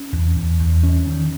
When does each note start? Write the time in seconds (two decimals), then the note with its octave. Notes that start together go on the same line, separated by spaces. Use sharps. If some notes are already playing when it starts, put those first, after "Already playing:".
Already playing: C#4
0.13 E2
0.36 E2
0.60 E2
0.83 C#4
1.07 D#3